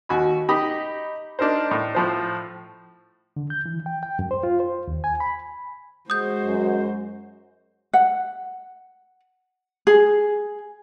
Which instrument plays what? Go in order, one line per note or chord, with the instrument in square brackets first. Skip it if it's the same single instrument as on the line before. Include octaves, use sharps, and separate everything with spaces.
[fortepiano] D#2 F#4 G#5 B5
D#4 G4 D#5 B5
D4 D#4 A#4 C5
A2
A2 F3 C5
[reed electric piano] D3
G6
E3
G5
G5
F#2
C5
F4
C5
D#2
G#5
B5
[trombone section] G#3 [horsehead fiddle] F#4 C5 [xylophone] D#6 G6
[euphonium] F#2
[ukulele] F#5
G#4